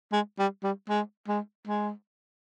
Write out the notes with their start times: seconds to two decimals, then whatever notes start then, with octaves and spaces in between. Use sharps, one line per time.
0.12 G#3
0.39 G3
0.63 G3
0.89 G#3
1.28 G#3
1.68 G#3